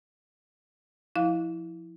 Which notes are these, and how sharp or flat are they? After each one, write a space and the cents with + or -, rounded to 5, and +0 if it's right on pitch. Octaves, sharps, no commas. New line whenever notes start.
F3 +0 E4 -10 F5 +0